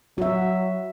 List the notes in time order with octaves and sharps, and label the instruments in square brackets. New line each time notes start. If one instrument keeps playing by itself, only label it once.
[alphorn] F#3 [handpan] F#4 E5